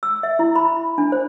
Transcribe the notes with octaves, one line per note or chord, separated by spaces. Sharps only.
E6
E5
E4
B5
D4
C5